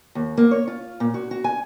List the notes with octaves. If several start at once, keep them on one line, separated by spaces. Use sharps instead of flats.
D#2
A#3
C#5
F4
A#2
F#4
F#4
G#5